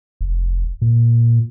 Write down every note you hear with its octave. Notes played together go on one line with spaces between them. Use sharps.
F1
A#2